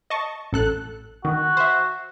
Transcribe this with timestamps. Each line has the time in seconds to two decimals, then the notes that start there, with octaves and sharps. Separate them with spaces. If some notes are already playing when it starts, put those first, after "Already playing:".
0.10 D#5 A5 C#6
0.53 A1 A4 F#6
1.25 D#3 F#4
1.57 C5 E5